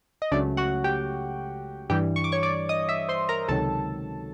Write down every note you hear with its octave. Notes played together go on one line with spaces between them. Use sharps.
D#5
C#2 C#3 F#3 A3 D4 D5
F#4 F#5
G4 G5
G2 E3 G3 G4 G5
C#6
D6
C#5 C#6
D5 D6
D#5 D#6
E5 E6
C5 C6
A#4 A#5
C#2 C3 D#3 F#3 A4 A5